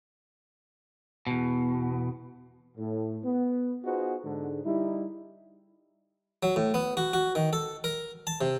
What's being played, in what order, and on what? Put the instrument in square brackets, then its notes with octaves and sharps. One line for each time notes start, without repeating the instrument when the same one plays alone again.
[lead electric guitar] E2 B2
[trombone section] A2
B3
B3 D#4 F4 F#4 G#4 C5
G#2 D3 G#3
G3 D#4 E4
[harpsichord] F#3
A2
B3
F#4
F#4
D#3
A4
A#4
A5
C3